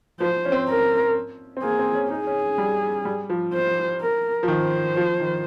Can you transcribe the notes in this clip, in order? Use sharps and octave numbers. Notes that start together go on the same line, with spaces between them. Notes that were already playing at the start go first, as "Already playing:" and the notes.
F3 C5
C#4
C4
A#4
C4
A#3 G#4
C4
C#4
D#4 G#4
C#4
G3
G3
F3
C5
A#4
F3
D#3 C5
F3
D#3